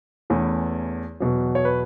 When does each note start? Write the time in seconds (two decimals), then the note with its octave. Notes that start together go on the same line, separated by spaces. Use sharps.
0.30 E2 E3 A3 C#4
1.20 E2 B2 F#3
1.55 C#5
1.65 B4